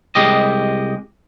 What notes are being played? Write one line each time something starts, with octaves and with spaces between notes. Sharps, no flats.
C2 G#3 G4 D#5